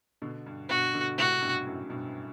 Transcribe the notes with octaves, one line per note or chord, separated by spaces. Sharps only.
B2 D3
G2
G2 B2 F#4
B2 D3
A2 C3 F#4
G2 B2
F#2 A2
G2 B2